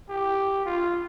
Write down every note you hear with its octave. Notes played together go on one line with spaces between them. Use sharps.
G4
F4